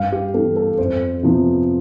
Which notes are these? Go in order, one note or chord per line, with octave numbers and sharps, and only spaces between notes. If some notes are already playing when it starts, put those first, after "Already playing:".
Already playing: G2 F5
G4
E3 G3 B3 A4
A4
F2 C5
C3 F3 B3